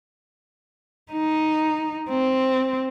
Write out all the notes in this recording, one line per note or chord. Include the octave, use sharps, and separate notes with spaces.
D#4
C4